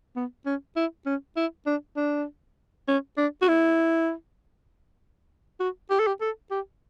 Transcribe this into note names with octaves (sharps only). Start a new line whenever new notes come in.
B3
C#4
E4
C#4
E4
D4
D4
C#4
D4
F#4
E4
F#4
G4
A4
G4
A4
G4